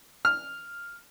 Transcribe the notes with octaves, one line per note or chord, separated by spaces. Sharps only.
F6